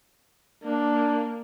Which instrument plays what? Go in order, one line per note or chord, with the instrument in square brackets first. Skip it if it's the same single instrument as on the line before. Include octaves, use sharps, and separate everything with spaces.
[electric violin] A#3 [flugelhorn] D4